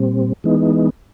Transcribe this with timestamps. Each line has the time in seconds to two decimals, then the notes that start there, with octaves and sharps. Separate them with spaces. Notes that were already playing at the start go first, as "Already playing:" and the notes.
Already playing: A#2 G3 C4
0.44 E3 G#3 B3 D#4